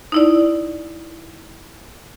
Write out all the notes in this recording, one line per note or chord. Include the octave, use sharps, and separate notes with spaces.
D#4 E4 D5